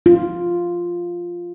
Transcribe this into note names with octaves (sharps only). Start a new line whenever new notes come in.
F4